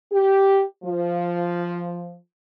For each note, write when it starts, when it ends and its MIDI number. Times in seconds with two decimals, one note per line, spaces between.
0.11 0.63 67
0.84 2.16 53